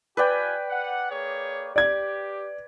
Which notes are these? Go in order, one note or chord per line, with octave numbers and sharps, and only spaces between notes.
F4 G4 B4 D5 G5 G#5
F#5
A#3 G#4 C#5
G4 D5 G#6